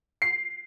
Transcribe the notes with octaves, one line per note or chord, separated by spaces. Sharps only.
C7